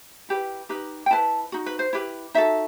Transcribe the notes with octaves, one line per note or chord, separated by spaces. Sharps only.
E4 G4 B4
D#4 G4 B4
G5
E4 B4 A5
D#4 F#4
B4
C5
E4 G4 B4
D#4 F#4 A4 E5